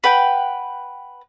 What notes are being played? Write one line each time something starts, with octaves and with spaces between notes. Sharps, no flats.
B4 F#5 G5